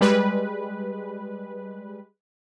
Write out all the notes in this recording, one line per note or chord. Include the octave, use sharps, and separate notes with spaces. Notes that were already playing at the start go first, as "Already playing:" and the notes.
G3 G#3 B4